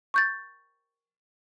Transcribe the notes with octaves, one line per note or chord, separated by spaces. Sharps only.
C#6 G6 A6